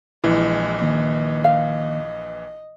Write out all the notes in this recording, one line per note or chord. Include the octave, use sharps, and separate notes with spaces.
A#1 E3 G#3 E4
D#3 A#3 D#5
F5